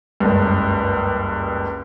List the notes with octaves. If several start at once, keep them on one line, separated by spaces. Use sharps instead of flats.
F#1 C#2 G2